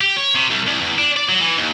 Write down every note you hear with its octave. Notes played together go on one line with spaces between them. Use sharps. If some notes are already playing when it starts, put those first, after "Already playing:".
G4
C#5
C3
C2
C2
E2
D4
D5
F#3
E3
D#2